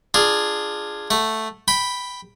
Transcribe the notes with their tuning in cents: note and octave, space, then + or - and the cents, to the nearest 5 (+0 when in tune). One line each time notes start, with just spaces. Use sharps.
D4 +15 F4 +0 G#4 +0
A3 +0 F#5 -10
G5 +0 B5 +0